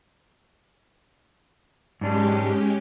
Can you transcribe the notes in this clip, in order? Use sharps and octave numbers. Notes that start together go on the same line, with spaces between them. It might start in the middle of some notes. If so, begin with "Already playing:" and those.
G#2 G#3 C#4 D4 G4